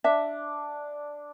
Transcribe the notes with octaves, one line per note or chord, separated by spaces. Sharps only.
D4 E5